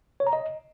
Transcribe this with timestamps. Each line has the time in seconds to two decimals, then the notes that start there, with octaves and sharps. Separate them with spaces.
0.20 C#5
0.27 A#5
0.33 D#5